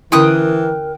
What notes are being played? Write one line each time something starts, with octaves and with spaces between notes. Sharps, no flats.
D3 E3 C#4 E4 A#4 G5 D#6 F#6